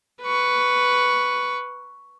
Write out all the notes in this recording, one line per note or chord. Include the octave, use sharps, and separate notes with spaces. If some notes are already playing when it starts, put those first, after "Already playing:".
B4 C#6